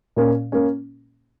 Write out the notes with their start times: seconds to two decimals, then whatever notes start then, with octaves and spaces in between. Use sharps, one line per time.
0.16 A#2 A#3 C#4
0.52 A#3 C#4